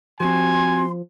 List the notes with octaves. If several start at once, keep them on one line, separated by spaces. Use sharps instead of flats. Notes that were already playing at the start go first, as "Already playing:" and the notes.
F3 C4 F#4 G4 G#5 C6